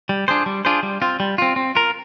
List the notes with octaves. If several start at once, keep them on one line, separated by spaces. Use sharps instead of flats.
G3
D4 F4 G#4 C5
G3
D4 F4 G#4 C5
G3
C4 F4
G3
C4 F4
C4
F4 A#4